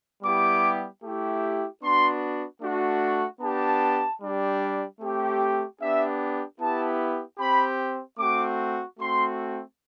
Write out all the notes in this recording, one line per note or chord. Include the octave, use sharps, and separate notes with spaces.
G3 B3 E4 G4 D6
A3 E4 G4
B3 D4 F#4 C6
A3 D4 F#4
B3 D4 G4 A5
G3 D4 G4
A3 C4 G4
B3 D4 G4 E5
B3 E4 G4 A5
C4 G4 B5
A3 C4 F#4 D6
A3 C4 F#4 C6